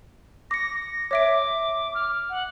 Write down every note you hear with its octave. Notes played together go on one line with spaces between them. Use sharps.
D6 A#6 C#7
C#5 E5 D6 D7
F6
F#5